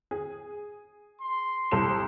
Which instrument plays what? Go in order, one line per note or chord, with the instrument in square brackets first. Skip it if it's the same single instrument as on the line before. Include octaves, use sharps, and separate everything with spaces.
[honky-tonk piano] G#4
[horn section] C6
[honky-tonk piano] C2 A4 E7